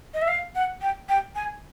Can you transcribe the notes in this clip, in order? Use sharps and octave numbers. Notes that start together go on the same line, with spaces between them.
D#5
E5
F5
F#5
G5
G5
G#5